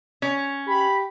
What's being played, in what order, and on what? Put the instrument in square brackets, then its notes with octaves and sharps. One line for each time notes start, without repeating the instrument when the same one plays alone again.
[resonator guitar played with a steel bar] C#4
[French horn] G4 [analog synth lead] B5